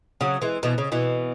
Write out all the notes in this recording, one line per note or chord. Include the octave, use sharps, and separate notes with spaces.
C#3 F#3
E3 G#3
B2 E3
C#3
B2 E3